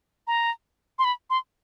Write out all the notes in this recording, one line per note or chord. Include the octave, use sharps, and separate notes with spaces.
A#5
C6
B5
C6